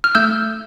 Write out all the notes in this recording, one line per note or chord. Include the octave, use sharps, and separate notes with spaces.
F6
A3 E6 G6